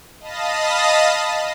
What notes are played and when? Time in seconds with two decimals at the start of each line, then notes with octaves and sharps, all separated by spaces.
0.20 D#5 F5 A5 B5 D#6 A#6